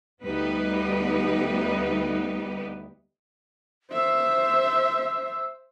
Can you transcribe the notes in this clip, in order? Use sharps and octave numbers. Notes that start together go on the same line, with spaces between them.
D2 G3 B3 D#4 G4 B4
C5 E5 E6